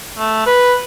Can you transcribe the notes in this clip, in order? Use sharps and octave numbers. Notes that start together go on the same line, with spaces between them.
A3
B4